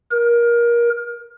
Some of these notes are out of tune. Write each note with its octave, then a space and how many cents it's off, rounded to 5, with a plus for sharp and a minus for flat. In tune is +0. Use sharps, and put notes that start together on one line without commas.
A#4 +25